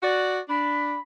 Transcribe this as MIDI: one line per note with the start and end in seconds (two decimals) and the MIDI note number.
0.03 0.39 66
0.03 0.39 74
0.49 0.95 62
0.49 0.99 83